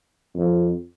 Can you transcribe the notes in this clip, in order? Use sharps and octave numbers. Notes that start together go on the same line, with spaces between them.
F2